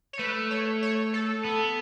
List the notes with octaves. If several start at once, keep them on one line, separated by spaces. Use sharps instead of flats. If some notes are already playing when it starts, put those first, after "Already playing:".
C#5
A3 B4
C#5
C#5
A4
B3